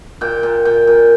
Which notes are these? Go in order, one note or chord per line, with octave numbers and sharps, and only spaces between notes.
A#2 G5
A#2
A#2 G5
A#2